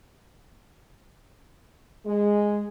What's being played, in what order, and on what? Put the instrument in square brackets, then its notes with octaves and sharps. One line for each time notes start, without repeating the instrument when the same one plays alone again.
[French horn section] G#3